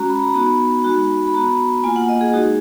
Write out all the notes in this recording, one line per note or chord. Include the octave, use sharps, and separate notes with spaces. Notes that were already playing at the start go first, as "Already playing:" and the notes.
Already playing: G#3 C#4 F#4 A#5
B5
A#5
B3 D#4 F#4 B5
G#3 D#4 F#4
B5
B3 F#4 A#5
A#3 F4 G#5
F#5
D#5
G#4
G#3 D#4 F#4